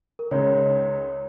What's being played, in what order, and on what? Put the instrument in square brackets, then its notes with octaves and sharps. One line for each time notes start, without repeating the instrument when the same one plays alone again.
[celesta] A#4
[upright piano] C#2 C#3 G#3 D#4 [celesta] C#5